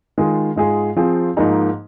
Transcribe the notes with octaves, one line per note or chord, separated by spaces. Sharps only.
D#3 G#3 F4 G#4
G#2 G#3 F4 G#4
F3 C4 F4 G#4
G#2 F3 A#3 D#4 G#4